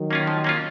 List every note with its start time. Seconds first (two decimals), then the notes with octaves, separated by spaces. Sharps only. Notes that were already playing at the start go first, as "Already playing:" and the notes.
Already playing: D#3 F#3
0.11 A#3 C#4 F4
0.27 F3
0.44 A#3 C#4 F4